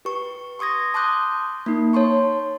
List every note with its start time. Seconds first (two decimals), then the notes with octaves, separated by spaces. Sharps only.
0.05 G4 B4 C#6
0.59 C6 C#6 D#6 G#6 A#6
0.94 A5 C6 D6 D#6 F#6 G6
1.66 A#3 D#4
1.93 C#5 A5 C6 C#6